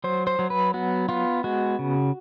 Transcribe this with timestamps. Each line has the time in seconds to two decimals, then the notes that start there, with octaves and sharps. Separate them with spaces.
0.04 F#3 C5
0.27 C5
0.39 F#3
0.50 B4
0.74 B3 F#4
1.09 B3 F4
1.44 G#3 F#4
1.79 C#3